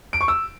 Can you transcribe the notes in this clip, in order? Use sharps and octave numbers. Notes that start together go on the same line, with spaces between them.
D7
C#6
E6